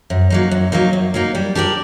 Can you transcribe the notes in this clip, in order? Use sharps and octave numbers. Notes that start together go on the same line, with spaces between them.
F#2
F#3 A#3 D#4
F#2
F#3 A#3 D#4
F#2
F#3 A#3 D#4
G3
D4 G4 A#4 D5